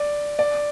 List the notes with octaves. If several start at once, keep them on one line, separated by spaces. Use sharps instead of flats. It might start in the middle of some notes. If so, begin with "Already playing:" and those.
Already playing: D5
D5